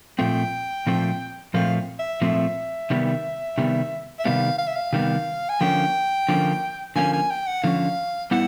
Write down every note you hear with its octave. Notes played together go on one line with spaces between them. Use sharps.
A#2 F3 A3 C4 G5
A#2 F3 A3 C4
A#2 F3 A3 C4 F5
E5
A#2 F3 A3 C4 E5
C3 D#3 G3 B3
C3 D#3 G3 B3
E5
C3 D#3 G3 B3 F5
F5
E5
F5
C3 D#3 G3 B3
G#5
D3 F3 A#3 C#4 G5
D3 F3 A#3 C#4
D3 F3 A#3 C#4 G#5
G#5
G5
F#5
D3 F3 A#3 C#4 F5
G3 B3 E4 F#5